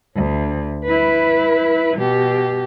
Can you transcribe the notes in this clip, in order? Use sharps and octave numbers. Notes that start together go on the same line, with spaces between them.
D2
E4 B4
B2 G4